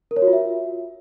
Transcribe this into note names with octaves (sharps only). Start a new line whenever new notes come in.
A#4
C#5
F#4
F4
E5